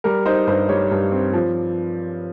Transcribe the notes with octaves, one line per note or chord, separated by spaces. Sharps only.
G3 A#4
D#4 C5
G2 C5
G3 C#5
G2
C4
F3